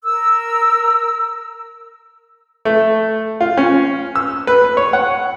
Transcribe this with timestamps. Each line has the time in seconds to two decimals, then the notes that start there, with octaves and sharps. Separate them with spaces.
0.03 A#4 E6
2.65 A3
3.41 F4
3.57 C#4
4.16 E6
4.47 B4
4.77 C#5
4.93 F#5